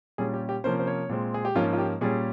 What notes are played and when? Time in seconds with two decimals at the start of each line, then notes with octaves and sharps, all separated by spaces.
0.18 A#2 G3 C#4 G#4
0.34 G4
0.49 G4
0.64 C3 F3 A#3 C#4 C5
0.80 C5
0.87 C#5
1.09 A#2 G#3 C4
1.34 G#4
1.45 G4
1.55 G#2 F3 A#3 C#4 F4
1.73 F4
1.78 G4
2.01 A#2 G3 C#4 G#4